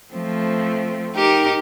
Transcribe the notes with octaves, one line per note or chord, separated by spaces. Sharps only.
F3 A3 C4
D#4 G4 A#4